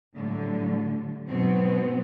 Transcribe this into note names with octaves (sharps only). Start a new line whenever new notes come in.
A2 D3 F#3 G3
G#2 B2 F#3 B3 C4